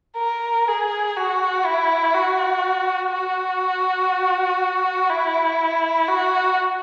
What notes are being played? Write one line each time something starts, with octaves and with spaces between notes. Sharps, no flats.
A#4
G#4
F#4
E4
F#4
F#4
E4
F#4